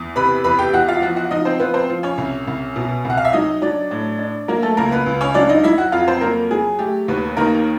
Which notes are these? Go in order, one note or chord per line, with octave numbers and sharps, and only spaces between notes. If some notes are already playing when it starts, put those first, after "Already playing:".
Already playing: E2
C3 B4 B5
E2 B4 B5
G4 G5
E2 F#4 F#5
F4 F5
F3 F#4 F#5
F#4 F#5
F3 D#4 D#5
C4 C5
F3 B3 B4
C4 C5
F3
C#4 C#5
C2
C2
B2
C2
F#5
F5
E5
F#3 D#4 D#5
F#3 D4 D5
A2
D4
F#3 A#3 A#4
A3 A4
C#2 A#3 A#4
B3 B4
C#2
C#4 C#5
F#3 D4 D5
D#4 D#5
F#3 E4 E5
F#4 F#5
F2 F4 F5
C4 C5
F#3 A#3 A#4
F#3 G#4
A3 G4
D#2 B3 B4
D#3 A#3 A#4